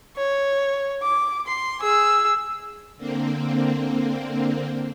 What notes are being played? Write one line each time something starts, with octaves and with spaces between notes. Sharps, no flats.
C#5
D6
C6
G#4 E6
D3 A#3 C4